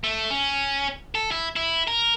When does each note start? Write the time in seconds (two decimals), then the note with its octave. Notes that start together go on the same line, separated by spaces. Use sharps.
0.04 A3
0.30 C#4
1.15 A4
1.32 E4
1.56 E4
1.88 A#4